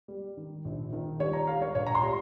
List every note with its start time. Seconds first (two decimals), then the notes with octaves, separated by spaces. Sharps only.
0.08 G3
0.37 D#3
0.65 A#1
0.93 D#3
1.19 G3 C#5
1.33 A#5
1.47 G3 F5
1.62 C#5
1.75 A#1 C#5
1.87 A#5
1.95 C6
2.03 G3